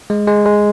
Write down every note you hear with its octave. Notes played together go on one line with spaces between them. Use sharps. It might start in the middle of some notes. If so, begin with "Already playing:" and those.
G#3
G#3
G#3